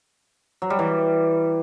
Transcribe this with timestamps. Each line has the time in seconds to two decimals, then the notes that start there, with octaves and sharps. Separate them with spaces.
0.62 F#3
0.70 G3
0.79 E3